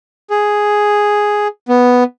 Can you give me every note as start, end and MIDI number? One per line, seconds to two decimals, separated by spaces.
0.30 1.48 68
1.68 2.04 59